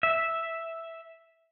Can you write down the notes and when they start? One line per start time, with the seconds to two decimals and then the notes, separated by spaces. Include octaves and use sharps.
0.03 E5